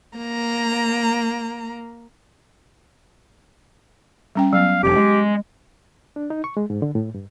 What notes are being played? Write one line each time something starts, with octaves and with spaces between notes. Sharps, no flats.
A#3 A#5
G3 C#4 G5
F#3 B3 F5
F1 F2 G4
G#3
D4
D#4
C#6
G#3
G#2
D3
A2
G2